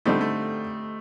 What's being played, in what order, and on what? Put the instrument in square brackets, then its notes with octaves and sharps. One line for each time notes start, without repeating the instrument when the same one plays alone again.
[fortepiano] D3 G3 C4 D#4 [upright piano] A3
[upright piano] A3